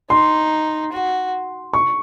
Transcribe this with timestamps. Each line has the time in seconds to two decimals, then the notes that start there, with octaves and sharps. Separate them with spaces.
0.10 D#4 C6
0.92 F#4
1.73 C#6